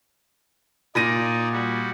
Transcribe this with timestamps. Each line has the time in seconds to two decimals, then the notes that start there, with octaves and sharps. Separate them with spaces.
0.95 A#2 D#4 D5 A#6 D#7
1.52 G3 F#4